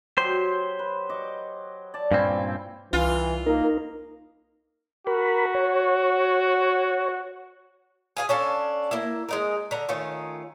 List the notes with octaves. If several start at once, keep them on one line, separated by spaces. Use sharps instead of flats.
F#3 G4 C5
B4
D#5 C#6 D6
D5 A5
G2 A#2 C4 C#4 E4
C2 E3 F4
A#3 D#4 A#4
F#4 A#4 B5
C#5
G#4 F5 G#5
C#4 D4 A4 F5
A#3 E4
G#3 D#4 A#4
D3 A#5
D#3 A3 C#4 F4